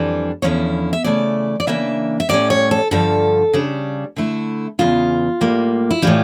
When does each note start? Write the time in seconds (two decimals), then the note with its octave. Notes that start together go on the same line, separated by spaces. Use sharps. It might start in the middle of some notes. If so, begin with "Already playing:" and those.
Already playing: F2 E3 G3 D4
0.42 E2 D3 F3 C#4 E4 C#5
0.93 E5
1.04 C#3 E3 A3 E4 D5
1.60 D5
1.67 C#3 E3 A#3 D4 E5
2.20 E5
2.29 A2 G3 C#4 D5
2.50 C#5
2.71 A4
2.91 G2 D3 F3 A4
3.53 C#3 G3 D4
4.16 D3 A3 E4
4.79 E2 C#3 E3 F4
5.41 A2 G3 A#3
5.91 E4
6.02 A2 E3 G3 F4